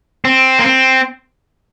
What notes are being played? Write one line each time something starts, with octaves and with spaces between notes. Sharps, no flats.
C4
A#3
C4